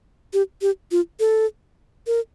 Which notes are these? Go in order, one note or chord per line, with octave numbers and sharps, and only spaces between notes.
G4
G4
F4
A4
A#4